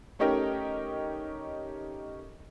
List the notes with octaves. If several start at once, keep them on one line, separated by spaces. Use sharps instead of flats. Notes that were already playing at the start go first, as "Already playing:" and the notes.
A3 C#4 D#4 G4 A#4